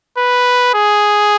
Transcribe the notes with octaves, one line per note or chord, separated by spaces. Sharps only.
B4
G#4